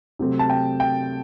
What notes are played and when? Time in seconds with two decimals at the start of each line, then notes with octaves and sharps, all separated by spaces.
0.19 C3 F#3 A3 C4
0.39 A5
0.50 G5
0.80 G5